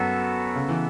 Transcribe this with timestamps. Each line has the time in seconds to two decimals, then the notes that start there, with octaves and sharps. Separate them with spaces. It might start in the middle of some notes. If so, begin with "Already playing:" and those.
Already playing: F#2 F#3 B3 F#4 A4
0.56 C#3
0.69 E3